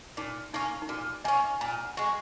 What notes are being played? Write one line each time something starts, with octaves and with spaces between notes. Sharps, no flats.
A#2 D#4
A#3 C#4 D#4
D#4
A#2 F#4
A#3 C#4 D#5 G#5
A#2 F#5 A#5
F#5 A#5
G#3 F#4